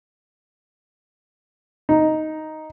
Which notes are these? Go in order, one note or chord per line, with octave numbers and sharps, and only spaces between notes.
D#4